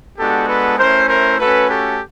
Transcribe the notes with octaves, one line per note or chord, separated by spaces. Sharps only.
G#3 B3 D4 F#4 G4 A4
A4 B4
A3 C#4 E4 A#4 C5
A#4 C5
A3 C#4 F#4 A4 B4
G4 A4